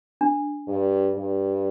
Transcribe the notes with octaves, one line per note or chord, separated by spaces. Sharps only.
D4
G2
G2